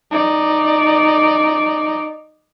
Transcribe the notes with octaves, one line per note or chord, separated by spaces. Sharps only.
D#4 D5